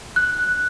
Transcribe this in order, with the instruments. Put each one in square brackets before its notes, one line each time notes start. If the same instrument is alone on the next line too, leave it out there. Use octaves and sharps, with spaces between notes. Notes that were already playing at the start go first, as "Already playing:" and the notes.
[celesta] F#6